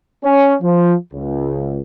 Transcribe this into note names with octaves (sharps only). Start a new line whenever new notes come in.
C#4
F3
C#2